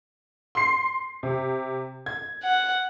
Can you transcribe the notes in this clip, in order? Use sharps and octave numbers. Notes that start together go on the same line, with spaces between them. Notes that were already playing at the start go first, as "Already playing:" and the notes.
C6 C7
C3
G#6
F#5